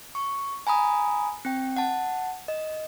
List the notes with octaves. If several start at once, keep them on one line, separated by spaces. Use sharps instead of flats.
C#6
G#5 A#5 B5 D#6
C4 G5
F#5 A5
D#5